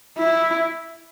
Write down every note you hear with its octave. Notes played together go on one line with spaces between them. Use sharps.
E4